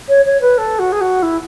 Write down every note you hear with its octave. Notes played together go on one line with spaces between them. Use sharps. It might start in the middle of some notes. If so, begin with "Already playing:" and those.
C#5
C#5
B4
A4
F#4
G#4
F#4
E4